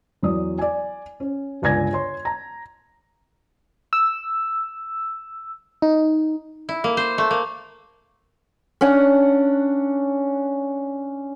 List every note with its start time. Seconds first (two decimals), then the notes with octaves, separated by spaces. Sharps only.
0.23 E2 F#3 D5 D#6
0.58 D5 G#5
1.20 C#4
1.62 G1 C#2 D5 G#5 G#6 A#6
1.93 C#5 C6
2.25 A#5
3.93 E6
5.82 D#4
6.69 E4
6.84 A#3
6.97 C5
7.18 A3
7.31 A#3
8.81 C#4 D4 F#5